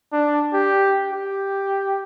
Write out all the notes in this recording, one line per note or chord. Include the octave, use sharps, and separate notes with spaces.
D4
G4
G4